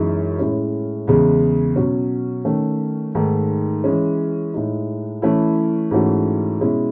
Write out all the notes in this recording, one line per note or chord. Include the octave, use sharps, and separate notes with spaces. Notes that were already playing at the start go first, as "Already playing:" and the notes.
Already playing: F#2 E3 G#3 D#4
A2 G#3 C#4 E4
E2 C#3 G#3
B2 F#3 C#4
D#3 A3 C#4
G#2 D#3 A3
E3 G#3 C#4
A2 G#3 D#4
E3 A3 C#4 E4
G#2 E3 A3 C#4 F#4
B2 G#3 C#4 E4